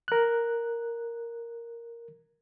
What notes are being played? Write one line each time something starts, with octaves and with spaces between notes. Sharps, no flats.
A#4 F#6